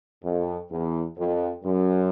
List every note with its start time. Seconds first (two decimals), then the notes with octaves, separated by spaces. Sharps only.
0.24 F2
0.71 E2
1.18 F2
1.64 F#2